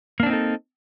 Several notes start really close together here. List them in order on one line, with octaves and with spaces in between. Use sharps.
A#3 D4 C4 D#4 A4